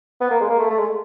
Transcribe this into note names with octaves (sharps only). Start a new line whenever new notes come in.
B3
A#3
G#3
A#3
A3
A3
G#3